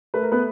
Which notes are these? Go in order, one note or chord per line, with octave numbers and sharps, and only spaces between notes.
A3 B4
A#4
B3 B4